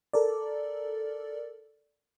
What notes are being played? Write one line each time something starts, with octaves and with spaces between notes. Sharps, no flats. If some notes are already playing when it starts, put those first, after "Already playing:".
A4 A#4 D5